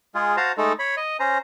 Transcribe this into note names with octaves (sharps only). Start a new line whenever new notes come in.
G#3 F4 G#4
F#4 C5 F5 A5 A#5
G#3 A3 D#4 A4
C#5 B5
D#5
C#4 C5 A#5